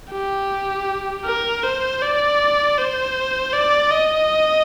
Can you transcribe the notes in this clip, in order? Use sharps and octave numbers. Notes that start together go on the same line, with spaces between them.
G4
A#4
C5
D5
C5
D5
D#5